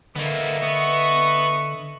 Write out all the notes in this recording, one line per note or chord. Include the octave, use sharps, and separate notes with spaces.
D3 A#3 B3 D#5 E5
B3 C#6